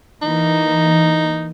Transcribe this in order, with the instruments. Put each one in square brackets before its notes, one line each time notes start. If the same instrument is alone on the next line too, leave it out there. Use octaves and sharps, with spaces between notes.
[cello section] E3 A#3 [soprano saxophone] D#4